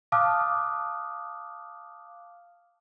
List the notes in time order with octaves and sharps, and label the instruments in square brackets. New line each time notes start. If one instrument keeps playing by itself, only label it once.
[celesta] F5 A5 D6 D#6 F6 F#6